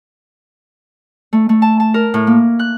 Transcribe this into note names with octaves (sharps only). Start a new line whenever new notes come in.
A3
A3
A5
A5
A#4
A2
A#3
F#6